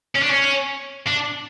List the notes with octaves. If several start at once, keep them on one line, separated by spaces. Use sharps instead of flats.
C#4
D4
C#4
D4